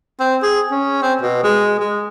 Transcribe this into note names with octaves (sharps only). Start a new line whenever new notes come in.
C4
G#4
C#4
C4
B2
G#3
G#3